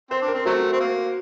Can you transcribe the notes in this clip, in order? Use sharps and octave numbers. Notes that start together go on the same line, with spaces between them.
C4 C5
D4
A#4
C4
C3 F#3 A3 F#4
C4
A#3